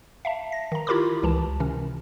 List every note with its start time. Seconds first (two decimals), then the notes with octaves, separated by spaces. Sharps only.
0.25 E5 F5 A5
0.52 A#6
0.72 D#3 A#5
0.87 E4 F4 G4 A#4 B5 D6
1.23 C#2 E3 A5
1.60 C3 D#3 C#4